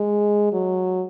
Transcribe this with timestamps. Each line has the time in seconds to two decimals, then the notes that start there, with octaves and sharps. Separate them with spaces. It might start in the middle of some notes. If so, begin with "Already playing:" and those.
Already playing: G#3
0.53 F#3